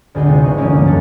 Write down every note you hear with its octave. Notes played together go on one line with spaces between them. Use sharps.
G#1 D2 G#4 D#5 G5
C3 G#3 C4 D#4 F4
B4 D#5 G#5 C#6
D2 E3 F3 A3 A#3 C#4
G#2 G#3 A3
F#2 A4 F5